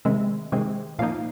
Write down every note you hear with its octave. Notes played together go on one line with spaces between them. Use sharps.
C3 D#3 G#3 C4 E5
C3 D#3 G#3 C4
A#2 F3 A#3 D#4 F5